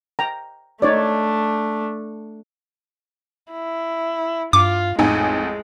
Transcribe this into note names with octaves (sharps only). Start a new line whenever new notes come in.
G5 A#5
A3 D4 D#4 C#5 D5
E4
G2 F4 D6
A1 F2 G#3 D#4 G#5